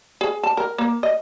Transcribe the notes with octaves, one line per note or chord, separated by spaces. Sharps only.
G#4
A5
A#4
A#3
D#5